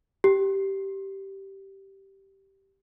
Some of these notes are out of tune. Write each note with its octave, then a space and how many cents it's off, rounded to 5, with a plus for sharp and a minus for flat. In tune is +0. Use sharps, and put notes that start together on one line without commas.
G4 -10